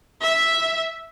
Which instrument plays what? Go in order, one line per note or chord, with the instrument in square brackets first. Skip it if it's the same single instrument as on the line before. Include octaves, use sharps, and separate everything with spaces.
[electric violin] E5